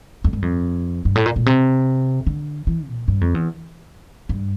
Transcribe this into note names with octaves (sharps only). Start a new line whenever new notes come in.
F2
G2
F2
G2
A2
A#2
A#2
C3
D3
E3
A#2
G2
F2
E2
G2